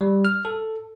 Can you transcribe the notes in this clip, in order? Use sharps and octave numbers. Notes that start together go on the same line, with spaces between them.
G3
F6
A4